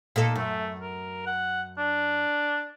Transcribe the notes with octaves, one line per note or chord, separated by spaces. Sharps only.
A#2 D#4 A4
F#2 A3
A#4
F#5
D4